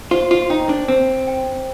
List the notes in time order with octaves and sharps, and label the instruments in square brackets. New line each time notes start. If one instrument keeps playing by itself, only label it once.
[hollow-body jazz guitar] F4 [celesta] C5
[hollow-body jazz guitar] F4
[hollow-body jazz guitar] D#4 [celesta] G5
[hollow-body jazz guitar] D4
[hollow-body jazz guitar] C4 [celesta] C5
[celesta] G5